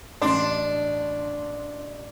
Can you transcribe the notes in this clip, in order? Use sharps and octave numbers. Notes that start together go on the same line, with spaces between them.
A1 D4 C6